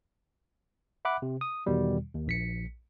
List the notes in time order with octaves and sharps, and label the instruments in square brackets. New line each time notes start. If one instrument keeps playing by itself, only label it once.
[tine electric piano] E5 F#5 B5 D6 F#6
C3
D#6
E2 B2 D#3 G3
D#2
A#1 B6 C#7